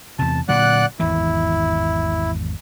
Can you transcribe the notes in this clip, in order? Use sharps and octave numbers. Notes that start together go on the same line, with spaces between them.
E2 C3 A5
A#2 D3 F#3 D5 F#5 F#6
G#1 E2 E3 E4